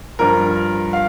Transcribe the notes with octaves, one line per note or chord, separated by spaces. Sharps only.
G2 F3 A#4
F5